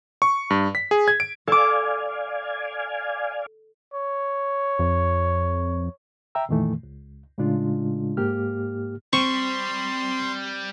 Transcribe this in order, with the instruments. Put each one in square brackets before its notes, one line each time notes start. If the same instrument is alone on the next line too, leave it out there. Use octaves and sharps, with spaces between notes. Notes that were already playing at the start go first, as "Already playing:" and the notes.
[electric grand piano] C#6
G2
B6
G#4
G#6
D7
[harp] A4 D6 [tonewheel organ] D5 F5 G#5
[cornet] C#5
[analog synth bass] F2
[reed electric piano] E5 G5 A#5 E6
F2 A#2 D#3 E3 A3
C#2
A2 C#3 G#3 D4 F4
G#2 A#3 G4 F6
[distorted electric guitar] G3 [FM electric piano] C4 [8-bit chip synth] C6 [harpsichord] C#6